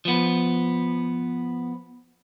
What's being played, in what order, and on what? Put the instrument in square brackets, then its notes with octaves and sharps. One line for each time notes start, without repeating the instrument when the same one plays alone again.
[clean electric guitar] F3 B3